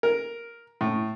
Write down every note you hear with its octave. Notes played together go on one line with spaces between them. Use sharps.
A#4
A2